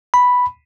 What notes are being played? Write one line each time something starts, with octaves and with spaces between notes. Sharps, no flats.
B5